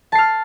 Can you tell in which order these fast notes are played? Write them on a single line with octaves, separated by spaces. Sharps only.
A5 C7 F6